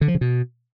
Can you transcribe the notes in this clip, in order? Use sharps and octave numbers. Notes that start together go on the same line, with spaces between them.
D3
F3
C#3
B2